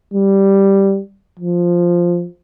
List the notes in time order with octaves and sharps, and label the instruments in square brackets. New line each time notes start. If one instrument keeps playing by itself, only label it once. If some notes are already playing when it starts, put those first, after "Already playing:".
[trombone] G3
F3